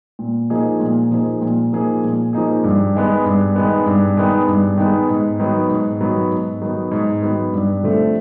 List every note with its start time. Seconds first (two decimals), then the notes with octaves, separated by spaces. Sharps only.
0.19 A#2
0.50 F3 A#3 D#4 G#4
0.80 A#2
1.11 F3 A#3 D#4 G#4
1.42 A#2
1.72 F3 A#3 D#4 G#4
2.03 A#2
2.33 F3 A#3 D#4 G#4
2.64 G2
2.94 D#3 G#3 B3
3.25 G2
3.56 D#3 G#3 B3
3.86 G2
4.17 D#3 G#3 B3
4.48 G2
4.78 D#3 G#3 B3
5.09 G#2
5.39 D#3 F#3 B3
5.69 G#2
6.01 D#3 F#3 B3
6.31 G#2
6.62 D#3 F#3 B3
6.92 G#2
7.22 D#3 F#3 B3
7.53 G2
7.83 D3 F3 A3 C4